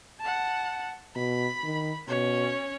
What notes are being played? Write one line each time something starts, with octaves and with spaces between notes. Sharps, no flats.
F#5 A5
B2 B5
D#3
B2 C#4 C#5